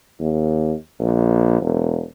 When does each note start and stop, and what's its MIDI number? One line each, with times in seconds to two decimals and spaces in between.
0.20 0.73 39
0.99 1.60 34
1.61 2.01 28